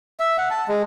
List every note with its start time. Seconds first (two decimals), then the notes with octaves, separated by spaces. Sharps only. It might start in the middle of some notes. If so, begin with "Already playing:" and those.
0.20 E5
0.38 F#5
0.50 A5
0.68 G#3